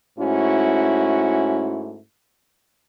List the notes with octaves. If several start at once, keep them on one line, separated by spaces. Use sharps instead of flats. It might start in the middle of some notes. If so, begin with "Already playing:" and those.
G#2 A3 C#4 E4 F#4